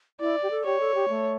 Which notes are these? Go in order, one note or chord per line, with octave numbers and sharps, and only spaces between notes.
E4 D5
G4
A4
G4 C#5
A4
G4
A3